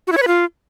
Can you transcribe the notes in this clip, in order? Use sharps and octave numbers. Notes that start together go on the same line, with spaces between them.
F#4
E4
C#5
B4
F4